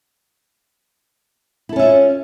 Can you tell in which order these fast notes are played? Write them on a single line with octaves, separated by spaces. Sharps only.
E4 A4 C#4 E5 F4